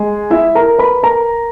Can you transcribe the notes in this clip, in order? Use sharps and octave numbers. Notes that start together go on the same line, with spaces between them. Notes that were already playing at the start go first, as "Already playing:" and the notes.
Already playing: G#3 G#4
E4 E5
A#4 A#5
B4 B5
A#4 A#5